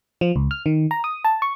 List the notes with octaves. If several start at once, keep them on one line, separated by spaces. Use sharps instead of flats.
F3
C#2
F6
D#3
A#5
D#6
A5
C#6